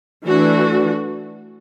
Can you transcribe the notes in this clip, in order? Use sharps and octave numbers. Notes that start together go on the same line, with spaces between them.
E3 A3 D4 F#4